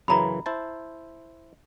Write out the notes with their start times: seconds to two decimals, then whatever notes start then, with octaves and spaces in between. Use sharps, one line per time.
0.08 F#2 C#3 E3 A#5 B5
0.46 E4 C5 A5